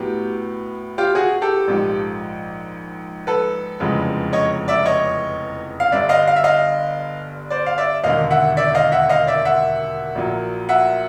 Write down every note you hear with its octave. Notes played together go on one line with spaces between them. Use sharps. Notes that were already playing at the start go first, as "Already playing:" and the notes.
Already playing: A2 F#3 B3 G4
F4 G4
F#4 G#4
G4 A4
A#1 G#2 F3
A4 B4
F1 E2 C#3 F3 G#3
C#5 D#5
D5 E5
C#5 D#5
F5
G1 G2 D3 D5 E5
D#5 F5
F5
E5
D#5 F5
C5 D5
F5
D5 E5
E1 D#2 D3 D#5 F5
E5 F#5
D5 E5
D#5 F5
E5 F#5
D#5 F5
D5 E5
E5 F#5
A#1 A#2 F#3
E5 F#5